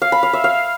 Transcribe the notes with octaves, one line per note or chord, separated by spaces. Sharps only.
F5
B5
F5
E5
F5